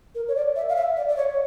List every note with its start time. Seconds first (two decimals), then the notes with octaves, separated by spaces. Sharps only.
0.14 A#4
0.28 C#5
0.35 D5
0.55 E5
0.69 F5
0.75 E5
0.96 D5
1.08 D5
1.16 C#5